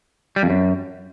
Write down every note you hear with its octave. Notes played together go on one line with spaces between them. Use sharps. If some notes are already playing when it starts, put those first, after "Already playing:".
G3
F2
F#2